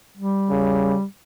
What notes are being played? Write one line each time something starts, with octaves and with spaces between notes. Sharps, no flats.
G3
C#3